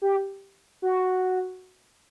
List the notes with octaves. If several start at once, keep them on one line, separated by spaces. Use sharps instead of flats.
G4
F#4